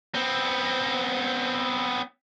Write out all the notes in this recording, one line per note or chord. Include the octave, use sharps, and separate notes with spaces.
B3 C4